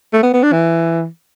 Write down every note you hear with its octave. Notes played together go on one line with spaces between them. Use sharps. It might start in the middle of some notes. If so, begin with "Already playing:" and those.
A3
B3
B3
D4
E3